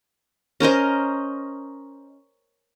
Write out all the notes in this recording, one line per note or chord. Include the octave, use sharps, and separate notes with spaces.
C#4 A#4 C5 D#5